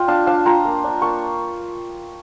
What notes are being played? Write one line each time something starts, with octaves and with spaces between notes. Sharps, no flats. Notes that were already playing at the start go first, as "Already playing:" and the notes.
Already playing: F4 D5 G5
D4 F5 A5
D4 F5 A5
F4 G5 A#5
A#3
D4
A#3 A5 C#6